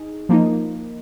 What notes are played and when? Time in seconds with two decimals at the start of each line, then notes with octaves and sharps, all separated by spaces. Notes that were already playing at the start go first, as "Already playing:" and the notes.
Already playing: D#4 G#4
0.29 F3 A#3 D#4